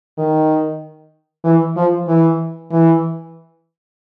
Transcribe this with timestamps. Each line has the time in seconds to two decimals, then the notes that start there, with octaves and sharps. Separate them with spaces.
0.18 D#3
1.44 E3
1.76 F3
2.08 E3
2.72 E3